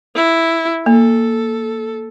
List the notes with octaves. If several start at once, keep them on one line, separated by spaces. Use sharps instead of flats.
E4
A#3 A4